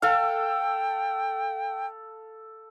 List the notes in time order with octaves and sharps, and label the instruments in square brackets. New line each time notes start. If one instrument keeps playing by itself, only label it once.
[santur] A4 F5 [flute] G5